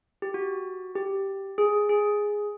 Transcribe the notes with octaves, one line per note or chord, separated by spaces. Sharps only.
G4
F#4
G4
G#4
G#4